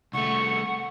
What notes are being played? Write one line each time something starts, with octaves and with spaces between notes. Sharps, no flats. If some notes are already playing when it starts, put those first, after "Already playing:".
C2 A3 F#5 C#6